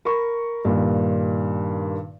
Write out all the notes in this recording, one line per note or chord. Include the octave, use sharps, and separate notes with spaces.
A#4 B5 C#6
G2 A#2 D#3